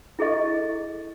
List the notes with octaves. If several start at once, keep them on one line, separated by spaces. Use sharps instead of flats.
E4 G#4 A4 D#5 C#6